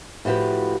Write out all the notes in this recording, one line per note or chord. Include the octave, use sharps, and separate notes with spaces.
A2 F3 F#4 G4 B4